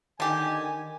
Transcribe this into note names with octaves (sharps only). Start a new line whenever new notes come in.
D3 D#3 G4 G#5